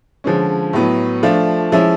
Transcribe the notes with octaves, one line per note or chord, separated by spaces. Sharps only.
D3 F3 G#3 C#4
A2 F#3 B3
F3 A3 D4 F4
F3 G#3 C#4 E4